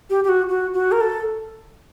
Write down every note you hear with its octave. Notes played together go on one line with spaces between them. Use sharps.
G4
G4
F#4
F#4
F#4
A#4
A4